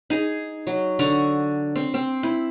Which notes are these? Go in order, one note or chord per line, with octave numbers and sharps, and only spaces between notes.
D#4 G#4
F#3
D3 A#5 C#6
C4
C4
E4